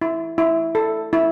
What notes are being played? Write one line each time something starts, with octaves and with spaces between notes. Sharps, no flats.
E4
E4
A4
E4